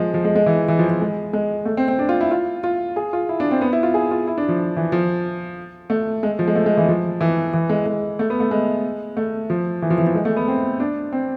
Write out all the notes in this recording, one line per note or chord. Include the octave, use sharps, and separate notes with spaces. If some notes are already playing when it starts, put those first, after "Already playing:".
Already playing: F3 G#3
F3
G#3
G#3
E3
E3
F3
F3
G#3
G#3
A3
C4
C4
D4
F4
E4
F4
F4
G#4
F4
E4
D4
C4
B3
E4
F4
G#4
F4
E4
D4
F3
E3
F3
A3
G#3
F3
G#3
A3
G#3
E3
F3
E3
E3
G#3
G#3
A3
B3
A3
G#3
A3
F3
E3
F3
E3
F3
G#3
A3
B3
C4
D4
C4